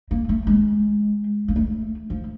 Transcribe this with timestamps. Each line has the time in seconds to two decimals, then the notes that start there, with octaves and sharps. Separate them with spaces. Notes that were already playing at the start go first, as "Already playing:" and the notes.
0.11 A#3
0.29 A3
0.47 G#3
1.48 A#3
1.56 A3
2.10 F3